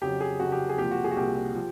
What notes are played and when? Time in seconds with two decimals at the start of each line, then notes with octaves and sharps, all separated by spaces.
0.01 F2 C#3 F#3 G4
0.20 G#4
0.39 F2 C#3 F#3 F#4
0.52 G4
0.69 G#4
0.78 C2 A#2 F3 G4
0.91 F#4
1.04 G#4
1.11 F#4
1.16 C2 A#2 F3 G4
1.55 F3